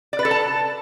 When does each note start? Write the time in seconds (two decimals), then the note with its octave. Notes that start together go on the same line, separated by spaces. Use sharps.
0.13 D5
0.19 B4
0.25 A4
0.31 A5